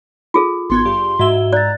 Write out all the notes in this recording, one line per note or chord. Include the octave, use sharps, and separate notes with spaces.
F4 G#4 A4
G#1 B3 C6 G#6
G2 G4
G#2 F#4 E5 E6 G7
D5 A#5 F#6 A6